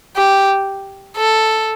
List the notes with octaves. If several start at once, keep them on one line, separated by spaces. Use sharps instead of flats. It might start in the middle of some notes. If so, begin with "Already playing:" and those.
G4
A4